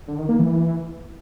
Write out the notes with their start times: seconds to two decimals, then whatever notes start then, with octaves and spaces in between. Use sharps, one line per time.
0.08 D3
0.18 D#3
0.29 A#3
0.39 E3